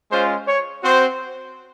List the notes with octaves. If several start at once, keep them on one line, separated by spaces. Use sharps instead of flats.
G#3 C#4 F4 C5
C#5
C4 F#4 C5